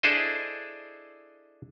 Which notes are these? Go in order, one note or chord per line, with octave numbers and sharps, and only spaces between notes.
D4 E4 G#4 A4 C5 D#5